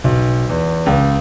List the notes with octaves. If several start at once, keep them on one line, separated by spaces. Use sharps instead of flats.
B1
E2
C#2